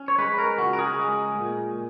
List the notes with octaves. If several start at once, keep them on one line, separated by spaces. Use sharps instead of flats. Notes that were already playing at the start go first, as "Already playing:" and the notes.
Already playing: C#4
C#5
G#3 B4
A#4
C#2 F#4
A#4
G#4
G#3
A#2